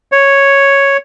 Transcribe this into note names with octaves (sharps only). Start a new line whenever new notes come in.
C#5